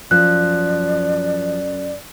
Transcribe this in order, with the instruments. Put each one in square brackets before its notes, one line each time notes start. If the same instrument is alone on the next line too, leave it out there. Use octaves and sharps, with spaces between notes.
[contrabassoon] F#2 [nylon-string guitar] F3 [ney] D5 [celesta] F#6